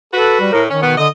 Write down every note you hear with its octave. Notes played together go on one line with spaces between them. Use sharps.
F#4 A4 B4
G3
A2 A#4
D#3 C#4
B2 B3
D3 D#5